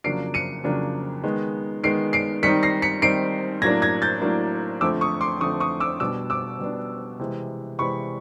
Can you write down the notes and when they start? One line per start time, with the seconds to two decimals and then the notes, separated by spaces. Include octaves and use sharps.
0.04 F2 C#3 F#3 A#3 D4 C7 D7
0.34 C#7 D#7
0.64 F2 C#3 F#3 A#3 D4
1.24 D#3 G#3 B3
1.84 D#3 G#3 B3 C7 D7
2.13 C7 D7
2.43 D#3 G3 C4 D#4 B6 C#7
2.63 A#6 C7
2.82 B6 C#7
3.02 D#3 G3 C4 D#4 C7 D7
3.61 A2 F#3 A#3 D4 G#6 A#6
3.82 G#6 A#6
4.02 G6 A6
4.22 A2 F#3 A#3 D4
4.81 F2 D3 F3 A3 C4 D6 E6
5.01 C#6 D#6
5.21 C6 D6
5.41 F2 D3 F3 A3 C4 C#6 D#6
5.60 C#6 D#6
5.80 D6 E6
6.00 B2 G3 B3 D4 D6 E6
6.30 D6 E6
6.59 B2 G3 B3 D4
7.19 C3 E3 G#3
7.78 C3 E3 G#3 B5 C#6